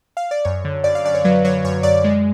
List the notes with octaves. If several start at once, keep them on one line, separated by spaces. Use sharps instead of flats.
F5
D5
F#2 C#5
D3
F#2 D5
F5
F#2 D5
C#5
F#3 B4
F#3 C#5
F#2 C#5
F#2 D5
G#3